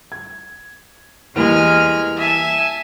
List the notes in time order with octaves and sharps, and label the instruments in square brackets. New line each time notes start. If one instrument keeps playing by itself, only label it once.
[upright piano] G#6
[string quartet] E2 G#3 F6 [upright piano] E3 G3 A#3
[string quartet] E5 G#5 A5